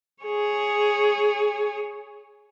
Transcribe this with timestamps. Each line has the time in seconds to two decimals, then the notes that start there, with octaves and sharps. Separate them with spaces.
0.24 G#4 C#5